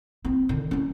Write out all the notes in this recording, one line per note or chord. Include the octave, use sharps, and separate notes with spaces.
C4
D3 D#3
F#3 C#4